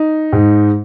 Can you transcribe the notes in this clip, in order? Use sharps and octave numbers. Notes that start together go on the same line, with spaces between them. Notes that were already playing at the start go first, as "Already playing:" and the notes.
Already playing: D#4
G#2